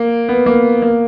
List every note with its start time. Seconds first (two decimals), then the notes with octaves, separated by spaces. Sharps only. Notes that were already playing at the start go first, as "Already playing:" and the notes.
Already playing: A#3
0.29 B3
0.46 A#3
0.82 A#3